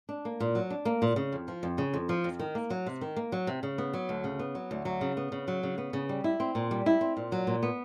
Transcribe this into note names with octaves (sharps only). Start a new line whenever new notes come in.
D4
A#3
A#2
F#3
D4
A#3
A#2
C#3
F2
F3
F2
C#3
F2
F3
F2
D#3
A#3
F#3
C3
D#3
A#3
F#3
C3
C#3
B3
F#3
D2
C#3
B3
F#3
D2
F#3
C#3
B3
C#3
F#3
C#3
B3
C#3
G3
E4
C4
A#2
G3
E4
C4
A#2
F#3
A#2
B3